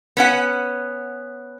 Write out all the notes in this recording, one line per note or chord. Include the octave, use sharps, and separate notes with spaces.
B3 C#4 F#5